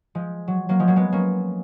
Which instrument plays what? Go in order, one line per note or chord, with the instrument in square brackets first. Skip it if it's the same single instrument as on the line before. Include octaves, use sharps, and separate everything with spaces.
[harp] F3 G#3
F#3
F#3 A#3
F3 G#3
F#3 A#3
G#3 B3
A#3 C#4